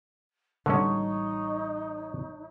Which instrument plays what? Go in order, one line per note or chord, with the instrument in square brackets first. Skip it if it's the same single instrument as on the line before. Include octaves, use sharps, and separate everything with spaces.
[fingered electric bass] A1 G3 [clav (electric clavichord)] D3 G#3 C#4 [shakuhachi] D#4 [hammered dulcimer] C#5